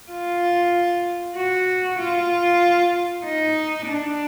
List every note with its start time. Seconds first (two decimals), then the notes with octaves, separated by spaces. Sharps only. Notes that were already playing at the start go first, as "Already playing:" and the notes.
0.12 F4
1.36 F#4
1.98 F4
3.24 D#4
3.86 D4